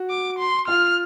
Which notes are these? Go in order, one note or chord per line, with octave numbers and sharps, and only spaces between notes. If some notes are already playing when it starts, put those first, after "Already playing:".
Already playing: F#4
D6
C6
F4 F6